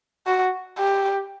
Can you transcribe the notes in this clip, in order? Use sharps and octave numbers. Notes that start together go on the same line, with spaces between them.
F#4
G4